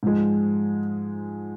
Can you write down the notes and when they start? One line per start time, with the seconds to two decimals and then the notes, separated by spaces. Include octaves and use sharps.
0.03 G#2 F3 G#3